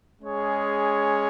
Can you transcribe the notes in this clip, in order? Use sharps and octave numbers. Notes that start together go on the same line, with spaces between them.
G#3 C#4 G#4 C#5